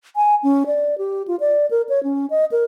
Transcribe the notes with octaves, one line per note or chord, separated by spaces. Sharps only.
G#5
C#4
D5
G4
F4
D5
A#4
C#5
C#4
D#5
A#4